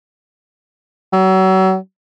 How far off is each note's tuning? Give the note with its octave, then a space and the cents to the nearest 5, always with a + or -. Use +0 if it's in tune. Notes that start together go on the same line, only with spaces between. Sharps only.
F#3 +35